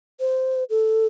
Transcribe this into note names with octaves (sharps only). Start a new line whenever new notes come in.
C5
A4